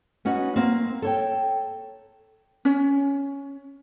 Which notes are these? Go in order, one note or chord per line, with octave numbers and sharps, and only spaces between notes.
B3 C#4 D#4 F#4
A#3 C4
A4 C#5 G5
C#4